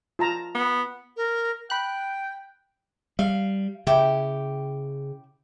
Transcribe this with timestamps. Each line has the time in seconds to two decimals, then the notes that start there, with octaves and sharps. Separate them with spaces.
0.19 F4 A5 A#5
0.55 B3
1.17 A#4
1.70 G5 B5 F#6
3.19 G3 F5
3.87 C#3 E4 G4 G5